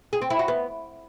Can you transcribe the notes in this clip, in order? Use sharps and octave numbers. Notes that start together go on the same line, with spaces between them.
G#4
C4
E4
F#4
B3